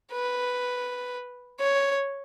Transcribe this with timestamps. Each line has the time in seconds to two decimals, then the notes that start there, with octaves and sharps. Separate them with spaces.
0.12 B4
1.60 C#5